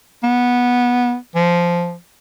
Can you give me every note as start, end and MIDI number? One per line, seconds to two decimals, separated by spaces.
0.23 1.15 59
1.35 1.95 53